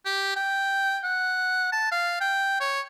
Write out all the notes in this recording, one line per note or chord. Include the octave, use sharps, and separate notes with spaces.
G4
G5
F#5
A5
F5
G5
C#5